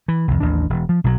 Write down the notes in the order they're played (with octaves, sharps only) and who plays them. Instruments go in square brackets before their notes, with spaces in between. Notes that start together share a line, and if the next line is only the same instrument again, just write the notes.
[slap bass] E3
C2 F2
A1 D#2 D4
E1
F3
B1 B2 D3 F#3